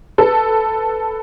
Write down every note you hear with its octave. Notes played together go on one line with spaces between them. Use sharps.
A4 B4